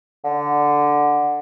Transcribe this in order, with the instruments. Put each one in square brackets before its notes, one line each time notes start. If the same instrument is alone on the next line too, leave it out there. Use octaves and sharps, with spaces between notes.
[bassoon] D3